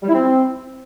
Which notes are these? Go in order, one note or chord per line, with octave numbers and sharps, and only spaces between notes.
G3
E4
C4